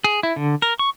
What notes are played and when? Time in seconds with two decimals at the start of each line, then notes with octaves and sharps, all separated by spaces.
0.04 G#4
0.23 E4
0.36 D3
0.62 A#4
0.79 C#6